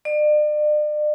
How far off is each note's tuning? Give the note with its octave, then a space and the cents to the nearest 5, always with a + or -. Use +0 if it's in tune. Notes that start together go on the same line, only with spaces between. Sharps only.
D5 +40